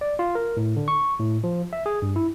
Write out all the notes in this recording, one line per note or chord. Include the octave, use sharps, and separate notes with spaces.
D5
F4
A#4
A2
D3
C#6
A2
F3
E5
G#4
G2
E4